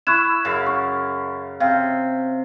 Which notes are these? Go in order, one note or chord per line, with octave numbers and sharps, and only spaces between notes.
E4 C#6 F#6 E7
F#2 C#3 F5
C#6
C3 F5 F6